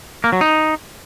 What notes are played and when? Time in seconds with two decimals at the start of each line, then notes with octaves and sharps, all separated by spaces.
0.24 A#3
0.32 F#3
0.41 D#4